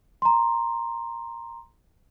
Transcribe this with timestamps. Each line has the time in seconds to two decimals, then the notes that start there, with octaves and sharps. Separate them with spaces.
0.22 A#5 C6